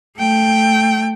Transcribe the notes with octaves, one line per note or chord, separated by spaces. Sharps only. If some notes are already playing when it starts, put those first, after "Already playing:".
A3 G5